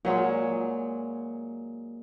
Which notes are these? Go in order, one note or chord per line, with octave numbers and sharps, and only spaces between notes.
A#2 F#3 G#3